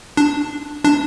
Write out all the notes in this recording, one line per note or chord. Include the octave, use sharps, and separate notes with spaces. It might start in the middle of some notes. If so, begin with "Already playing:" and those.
D4
D4